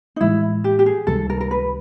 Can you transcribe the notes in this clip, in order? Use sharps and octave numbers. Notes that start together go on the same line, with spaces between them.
D#4
A2 E3 G#3 E4
G4
G4
G#4
C#2 C3 D#3 G3 A4
A#4
A#4
B4